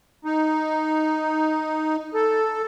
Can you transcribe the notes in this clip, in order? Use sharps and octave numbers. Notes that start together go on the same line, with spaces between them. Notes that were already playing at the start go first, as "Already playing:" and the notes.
D#4
A4